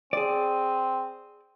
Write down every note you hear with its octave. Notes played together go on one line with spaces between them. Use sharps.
C4 G#4 D5